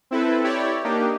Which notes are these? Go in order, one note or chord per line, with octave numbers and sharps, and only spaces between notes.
C4 E4 A4 B4
E4 G4 C#5 D5
A#3 D4 D#4 G4